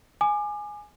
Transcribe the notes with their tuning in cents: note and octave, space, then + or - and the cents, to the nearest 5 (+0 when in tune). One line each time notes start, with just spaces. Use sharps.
G#5 +0 D6 +35